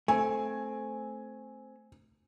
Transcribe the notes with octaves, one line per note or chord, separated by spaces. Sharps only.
A3 C4 G#5